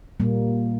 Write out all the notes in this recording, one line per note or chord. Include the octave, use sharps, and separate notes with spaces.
A#2 G3 A#3